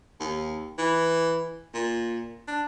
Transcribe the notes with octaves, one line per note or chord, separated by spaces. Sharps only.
D#2
E3
A#2
D4